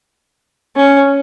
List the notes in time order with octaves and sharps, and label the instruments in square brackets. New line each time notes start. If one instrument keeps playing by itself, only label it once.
[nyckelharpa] C#4